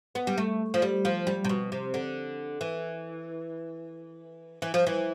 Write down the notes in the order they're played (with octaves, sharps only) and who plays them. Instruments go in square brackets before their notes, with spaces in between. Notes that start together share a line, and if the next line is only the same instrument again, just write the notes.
[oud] B3
G3
A3
F3
G3
F3
G3
C3
B2
C3
D3
E3
E3
F3
E3